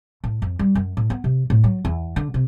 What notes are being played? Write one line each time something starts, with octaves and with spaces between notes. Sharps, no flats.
A2
F2
G3
F#2
A2
B3
C3
A2
F#3
E2
D3
C3